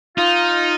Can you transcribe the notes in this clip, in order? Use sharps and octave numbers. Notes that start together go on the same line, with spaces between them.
D#4 F4